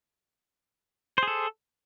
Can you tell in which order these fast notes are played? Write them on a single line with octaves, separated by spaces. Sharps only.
C5 G#4 A4